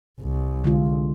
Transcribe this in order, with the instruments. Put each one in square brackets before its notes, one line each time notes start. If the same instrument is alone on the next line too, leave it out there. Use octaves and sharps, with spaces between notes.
[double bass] C2
[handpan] D3 G#3 F4